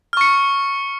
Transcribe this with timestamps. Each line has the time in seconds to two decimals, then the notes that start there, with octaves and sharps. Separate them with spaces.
0.13 F6
0.17 C#6
0.21 C#7